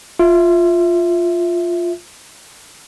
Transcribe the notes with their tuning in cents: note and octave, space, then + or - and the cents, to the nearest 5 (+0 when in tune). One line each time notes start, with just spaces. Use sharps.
F4 +0 E5 +0